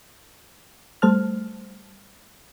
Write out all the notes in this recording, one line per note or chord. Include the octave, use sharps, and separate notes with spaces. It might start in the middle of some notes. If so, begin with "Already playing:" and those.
G3 A3 C5 A5 F6